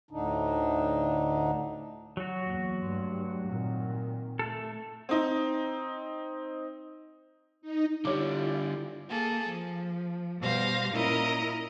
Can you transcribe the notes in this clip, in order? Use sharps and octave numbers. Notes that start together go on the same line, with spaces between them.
D2 A2 D3 D4 D#4
F#3 F#4
E2 A#3
G2 A3 C6
A#2 D#3 C4
A3 A4
C4 D#4
D#4
D3 G3 E4 F4 G4 C#5 D5 D6
A#3 G#4 A4
F3
B2 G3 C5 F5 A#6
A#2 C#4 E4 A#4 D#5 A#5